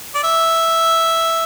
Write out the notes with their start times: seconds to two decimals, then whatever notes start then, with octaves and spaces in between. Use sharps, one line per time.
0.15 D5
0.24 E5